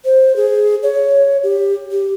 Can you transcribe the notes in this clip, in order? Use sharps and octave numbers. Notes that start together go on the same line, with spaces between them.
C5
G#4
C#5
G4
G4